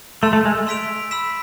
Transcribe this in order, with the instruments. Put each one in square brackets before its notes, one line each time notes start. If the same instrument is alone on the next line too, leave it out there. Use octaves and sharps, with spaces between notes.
[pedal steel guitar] A3 [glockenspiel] C6 E6 A6
[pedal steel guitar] A3
G#3
[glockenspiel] C6 E6 B6 D7 F7
B5 E6 B6 E7